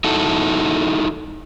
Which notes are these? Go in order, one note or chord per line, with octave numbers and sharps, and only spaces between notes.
D#4 E4 F#4 A4